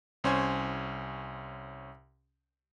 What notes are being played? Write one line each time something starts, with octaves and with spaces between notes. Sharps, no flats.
C2 C#4 C5 C#5 G#5